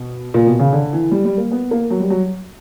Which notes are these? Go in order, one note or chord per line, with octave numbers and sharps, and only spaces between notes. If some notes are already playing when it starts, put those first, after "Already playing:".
Already playing: B2
A#2
B2
C#3
D3
E3
G3
G3
A#3
B3
A#3
F#3
G3
F#3